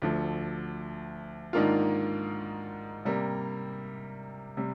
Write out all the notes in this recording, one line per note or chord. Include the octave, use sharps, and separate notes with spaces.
D2 D3 F3
G#2 D#3 A#3 D4 F4
C3 G3 A#3
C3 G3